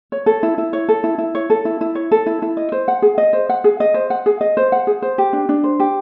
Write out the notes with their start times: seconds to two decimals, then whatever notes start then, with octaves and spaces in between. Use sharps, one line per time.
0.12 C#5
0.26 A4
0.43 E4
0.58 E4
0.73 C#5
0.89 A4
1.04 E4
1.18 E4
1.35 C#5
1.50 A4
1.65 E4
1.81 E4
1.95 C#5
2.11 A4
2.26 E4
2.42 E4
2.57 D#5
2.72 C5
2.88 F#5
3.02 G#4
3.18 D#5
3.33 C5
3.49 F#5
3.64 G#4
3.80 D#5
3.94 C5
4.10 F#5
4.26 G#4
4.41 D#5
4.57 C5
4.72 F#5
4.87 G#4
5.02 C5
5.18 G4
5.33 D4
5.49 D4
5.64 C5
5.80 G4